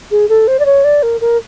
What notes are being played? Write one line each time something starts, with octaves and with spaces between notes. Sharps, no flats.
G#4
A4
C5
D5
C#5
D5
A#4
A#4